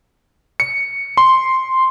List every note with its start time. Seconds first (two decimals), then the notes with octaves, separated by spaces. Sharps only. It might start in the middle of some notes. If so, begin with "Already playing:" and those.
0.60 C#7
1.17 C6